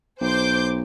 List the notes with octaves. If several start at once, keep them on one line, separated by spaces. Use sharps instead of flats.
B1 C5 D6 G6